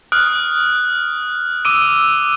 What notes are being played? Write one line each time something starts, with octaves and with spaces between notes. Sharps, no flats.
D#6 F6 F#6 D7
D6 E6 D7 D#7